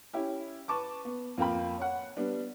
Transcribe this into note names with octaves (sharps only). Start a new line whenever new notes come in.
C#4 E4 G4
B4 A5 C#6 D6
B3
F2 A#3 F4 G5 B5
C#5 F#5
G3 B3 D4